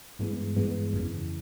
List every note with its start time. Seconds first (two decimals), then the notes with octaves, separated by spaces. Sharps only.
0.19 G2 E3 G#3 B3
0.56 G2 E3 G#3 B3
0.93 F2 C#3 E3